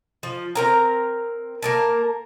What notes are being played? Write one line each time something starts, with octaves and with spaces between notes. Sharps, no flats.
F3
C4 A#4 A#5
A#3 A#4 A5